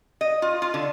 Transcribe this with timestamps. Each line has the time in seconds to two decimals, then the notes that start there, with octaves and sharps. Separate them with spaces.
0.21 D#5
0.42 F4
0.62 F4
0.74 D3